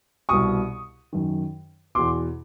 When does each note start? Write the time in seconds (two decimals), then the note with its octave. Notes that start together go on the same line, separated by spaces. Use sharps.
0.29 C2 B2 C#6 D#6
1.12 F#2 D#3
1.95 E2 B2 C6 D6